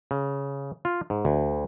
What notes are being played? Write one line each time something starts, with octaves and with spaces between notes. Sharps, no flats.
C#3
F4
G#2
D2